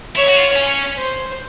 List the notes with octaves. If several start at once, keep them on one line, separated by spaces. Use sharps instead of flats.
E4 C#5
F#4
F4
C#4
C5